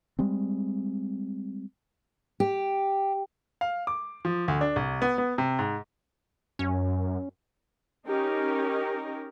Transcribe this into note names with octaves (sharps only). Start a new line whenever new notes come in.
G3 G#3 C4
G4
F5
D6
F3
D2
D4
C2
B3
B3
C3
G#2
F#2 C#4
C#4 D#4 G4 A#4